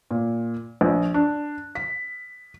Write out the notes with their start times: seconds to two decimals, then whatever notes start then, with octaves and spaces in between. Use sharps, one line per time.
0.11 A#2
0.81 A#1
1.14 D4
1.75 B6